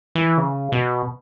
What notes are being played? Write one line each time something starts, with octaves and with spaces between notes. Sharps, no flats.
E3
C#3
B2